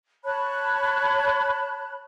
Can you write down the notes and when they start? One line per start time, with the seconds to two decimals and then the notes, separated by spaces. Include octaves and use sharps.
0.25 C#5 A5 B5 F#6